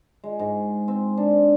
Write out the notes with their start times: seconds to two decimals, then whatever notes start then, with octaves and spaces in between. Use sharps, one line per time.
0.24 G#3
0.39 G#2
0.88 C4
1.17 D4